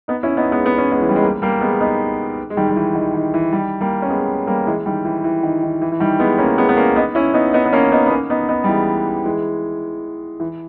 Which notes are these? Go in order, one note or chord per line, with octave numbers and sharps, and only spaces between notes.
B3 D#4
C#4 E4
B3 D#4
G#3 B3
B3
C#4
G#3 B3
E3
G3
G#3
G3 A#3
G3 A#3
G#3 B3
B3 D#4
G#3
D#3 G3
G3
E3
D#3
D#3
E3
D#3 G3
G3 A#3
C#4
G#3 B3
G3 A#3
E3 G#3
D#3 G3
E3
E3
D#3
D#3
E3
E3
D#3 G3
G#3 B3
A#3 C#4
G#3 B3
B3
A#3 C#4
B3 D#4
C#4 E4
B3 D#4
B3 D#4
B3
A#3 C#4
B3 D#4
B3
A#3 C#4
B3 D#4
B3 D#4
G3
E3 G#3
E3 G#3
E3